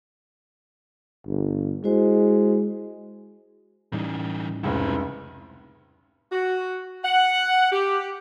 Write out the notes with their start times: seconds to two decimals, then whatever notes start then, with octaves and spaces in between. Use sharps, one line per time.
1.26 G1
1.84 G#3 E4 F#4 C5
3.93 A2 E3 G3 C#4 D#4
4.63 F1 C#2 E4 C5
6.32 F#4
7.04 F#5
7.71 G4